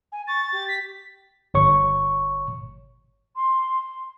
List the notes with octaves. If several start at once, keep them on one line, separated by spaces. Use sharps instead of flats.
G#5
C#6 A6
G4
B6
G1 C#5 C#6
C6